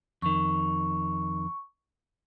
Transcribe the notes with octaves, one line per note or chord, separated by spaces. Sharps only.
F2 D#3 C#6